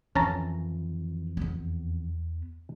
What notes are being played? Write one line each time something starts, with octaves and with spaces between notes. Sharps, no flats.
F2 D#3 E3 C#4 A5 A#5
E2 B3